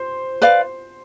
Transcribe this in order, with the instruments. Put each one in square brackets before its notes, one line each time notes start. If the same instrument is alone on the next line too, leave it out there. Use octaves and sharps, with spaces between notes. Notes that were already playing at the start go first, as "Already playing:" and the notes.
Already playing: [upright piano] C5
[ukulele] B4 D5 F5